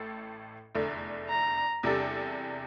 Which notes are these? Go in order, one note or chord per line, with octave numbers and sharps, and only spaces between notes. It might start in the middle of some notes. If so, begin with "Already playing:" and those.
Already playing: A1 A2 A4
F1 E2 D3 A3
A#5
E2 C3 G3 D4 A4